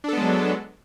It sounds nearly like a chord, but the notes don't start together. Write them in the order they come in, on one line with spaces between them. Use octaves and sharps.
D4 A4 B3 G#3 F#3